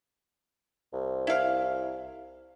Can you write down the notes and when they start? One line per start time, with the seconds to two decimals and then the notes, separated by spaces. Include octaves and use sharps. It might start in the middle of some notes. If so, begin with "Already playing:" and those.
0.93 C2
1.27 E4 F5